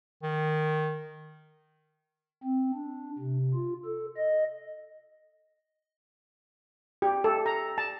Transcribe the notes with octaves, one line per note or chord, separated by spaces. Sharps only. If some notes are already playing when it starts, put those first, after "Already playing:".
D#3
C4
D4
C3
F4
A4
D#5
G4
A4
A#5
A5